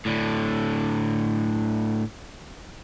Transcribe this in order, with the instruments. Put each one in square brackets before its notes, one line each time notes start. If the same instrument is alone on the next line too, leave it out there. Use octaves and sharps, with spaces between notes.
[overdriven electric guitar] A2 D3